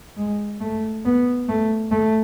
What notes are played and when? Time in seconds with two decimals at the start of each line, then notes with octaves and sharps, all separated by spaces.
0.17 G#3
0.61 A3
1.05 B3
1.49 A3
1.91 A3